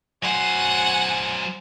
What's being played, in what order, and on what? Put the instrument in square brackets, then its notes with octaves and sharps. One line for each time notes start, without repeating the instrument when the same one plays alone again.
[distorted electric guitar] F#3 C5 [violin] F#5 G#5